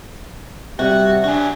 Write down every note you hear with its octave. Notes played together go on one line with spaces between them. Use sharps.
C3 G3 F#4
D4 F#4 G#4